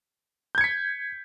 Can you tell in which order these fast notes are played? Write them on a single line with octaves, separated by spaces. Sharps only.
G6 G#6 C#7 B6